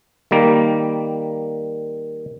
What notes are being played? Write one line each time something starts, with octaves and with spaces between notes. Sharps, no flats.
D#3 G3 A#3